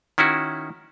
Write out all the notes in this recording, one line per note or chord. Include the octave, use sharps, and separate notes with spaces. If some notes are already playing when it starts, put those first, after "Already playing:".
D#3 C#4 E4 F#4